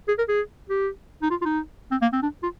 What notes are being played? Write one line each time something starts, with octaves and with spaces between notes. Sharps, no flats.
G#4
A#4
G#4
G4
D#4
F4
F4
D#4
C4
A#3
C4
D4
F4